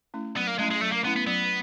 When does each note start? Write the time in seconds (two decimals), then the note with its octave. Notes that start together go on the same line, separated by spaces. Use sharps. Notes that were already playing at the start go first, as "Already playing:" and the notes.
0.14 A3 C#4 E4
0.36 F#3 B3
0.47 A#3
0.59 G#3 A3 C#4 E4
0.71 G#3
0.81 F#3 A3
0.92 A#3
1.04 A3 B3 C#4 E4
1.16 B3
1.27 F#3 B3